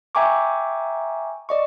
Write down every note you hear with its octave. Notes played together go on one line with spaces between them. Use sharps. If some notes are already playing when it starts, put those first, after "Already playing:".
E5 G5 G#5 A#5 C#6 D6
D5 D#5 C#6